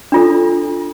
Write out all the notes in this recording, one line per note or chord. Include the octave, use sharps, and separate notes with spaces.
D4 F4 A4